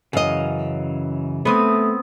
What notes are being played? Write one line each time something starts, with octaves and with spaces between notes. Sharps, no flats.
F#2 C#3 E3 D#5 F5
A3 B3 C4 D#6